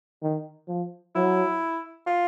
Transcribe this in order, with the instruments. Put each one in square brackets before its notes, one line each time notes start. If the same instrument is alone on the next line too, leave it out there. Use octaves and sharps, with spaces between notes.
[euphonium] D#3
F3
[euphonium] F#3 [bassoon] E4
[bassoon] F4